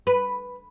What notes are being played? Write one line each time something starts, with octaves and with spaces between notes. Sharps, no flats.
B4